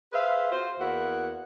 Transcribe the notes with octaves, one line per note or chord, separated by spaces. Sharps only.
G#4 B4 C5 E5 F5
F4 F#4 C5
E2 A#3 E4 F#4 F#5